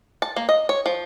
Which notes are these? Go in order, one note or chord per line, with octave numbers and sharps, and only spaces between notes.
A5
A#3
D#5
C#5
F3